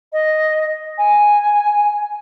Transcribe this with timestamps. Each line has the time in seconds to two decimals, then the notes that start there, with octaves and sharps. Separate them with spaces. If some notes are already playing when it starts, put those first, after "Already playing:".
0.13 D#5
0.98 G#5